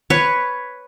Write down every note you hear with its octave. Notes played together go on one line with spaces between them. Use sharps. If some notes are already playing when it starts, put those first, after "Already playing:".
B4 C#5